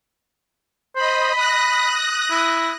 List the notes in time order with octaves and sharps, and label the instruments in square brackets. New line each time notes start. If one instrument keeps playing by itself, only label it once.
[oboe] C5 [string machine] D#5 B5
[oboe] B5 [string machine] D#6 F#6 A#6
[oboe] E4